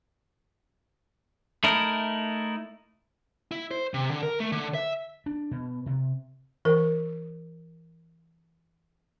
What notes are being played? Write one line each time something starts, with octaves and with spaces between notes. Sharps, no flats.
A3 D#4 E4 A#4
E4
C5
C3
D3
A#4
A3
D3
E5
D4
B2
C3
E3 A#4